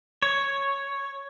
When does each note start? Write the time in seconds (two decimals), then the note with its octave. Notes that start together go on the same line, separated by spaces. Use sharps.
0.22 C#5